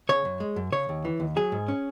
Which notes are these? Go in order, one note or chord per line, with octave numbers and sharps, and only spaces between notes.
C#3 C#5
F#2
G#3
F#2
C#3 C#5
D#2
E3
D#2
F#3 G#4
G#2
C#4